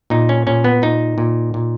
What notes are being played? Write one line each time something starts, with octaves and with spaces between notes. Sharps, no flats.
A#2 D#4
C#4
A#2 C#4
B3
A#2 D#4
A#2
A#2